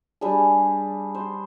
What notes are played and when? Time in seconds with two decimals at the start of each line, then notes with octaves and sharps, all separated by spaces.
0.21 G3 D4 G#4
1.15 C5